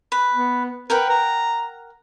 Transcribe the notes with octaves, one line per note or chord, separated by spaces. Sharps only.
B4
B3
A#4 B4 F#5 G5
A#5